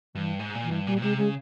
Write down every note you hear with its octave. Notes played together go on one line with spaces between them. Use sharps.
G2 E3
G#2
A#2
E3
G2
A#2 G3
A#2
C3 G#3
C#3 G#3